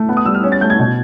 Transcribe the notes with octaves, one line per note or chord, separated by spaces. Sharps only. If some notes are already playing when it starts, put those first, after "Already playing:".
Already playing: A3
B3
D#6
G3 E6
F6
C#4
A6
A3 G6
G#6
B2